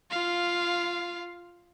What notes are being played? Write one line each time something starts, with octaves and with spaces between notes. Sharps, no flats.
F4 F5